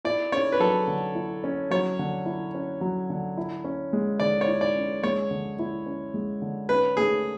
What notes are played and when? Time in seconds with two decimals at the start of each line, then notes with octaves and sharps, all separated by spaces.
0.05 E4 D5
0.32 C#4 C#5
0.52 B4
0.60 F#3 A4
0.88 D3
1.15 E4
1.44 C#4
1.71 F#3 C#5
1.99 D3
2.26 E4
2.55 C#4
2.81 F#3
3.10 D3
3.37 E4
3.64 C#4
3.93 G#3
4.20 D3 D5
4.41 C#5
4.48 E4
4.61 D5
4.76 C#4
5.03 G#3 C#5
5.31 D3
5.59 E4
5.86 C#4
6.14 G#3
6.42 D3
6.69 C#4 B4
6.97 A3 G#4